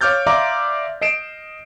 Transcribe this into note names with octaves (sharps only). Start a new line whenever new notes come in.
C#5 F5 D6 F6 G6 A6
D5 E5 F5 A#5 C6 D6
D#5 C7 D7 E7